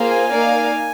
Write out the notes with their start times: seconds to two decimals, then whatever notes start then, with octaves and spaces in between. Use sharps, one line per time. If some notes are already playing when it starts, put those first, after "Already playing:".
Already playing: A#3 F4 G#4 C5 F5
0.11 G#5
0.30 A#3 D#4 A#4 D5 F5